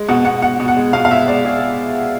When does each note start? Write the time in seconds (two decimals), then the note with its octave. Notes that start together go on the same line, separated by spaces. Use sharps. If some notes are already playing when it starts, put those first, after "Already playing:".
Already playing: G#3
0.08 B2 F#5
0.25 B2 F#5
0.42 B2 F#5
0.60 B2
0.68 F#5
0.77 G#3
0.93 B2 F5
1.05 F5
1.11 G#3 E5
1.28 G#3 D5
1.45 B2 G#4